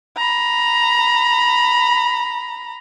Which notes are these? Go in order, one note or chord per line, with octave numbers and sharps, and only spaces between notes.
A#5 B5